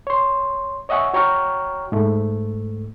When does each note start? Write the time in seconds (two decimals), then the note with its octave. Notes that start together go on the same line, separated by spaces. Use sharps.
0.07 C#5 C6
0.89 C#5 D#5 E5 F#5 G#5 C#6
1.14 F#4 C#5 G5 A#5 C#6 F6
1.92 G#2 A3